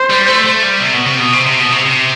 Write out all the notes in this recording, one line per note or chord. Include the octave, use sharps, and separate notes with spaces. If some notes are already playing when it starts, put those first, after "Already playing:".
Already playing: C5
G3
A3
A3
G3
C3
B2
C3
B2
C3
C3
B2
C3
C3